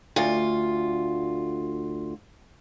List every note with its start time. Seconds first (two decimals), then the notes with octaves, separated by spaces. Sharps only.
0.16 D2 F4